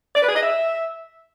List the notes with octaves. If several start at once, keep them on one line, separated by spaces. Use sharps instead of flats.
D5
B4
G#4
D#5
E5